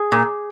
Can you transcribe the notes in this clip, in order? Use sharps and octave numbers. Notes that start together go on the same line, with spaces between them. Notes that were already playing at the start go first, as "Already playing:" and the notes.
Already playing: G#4
A#2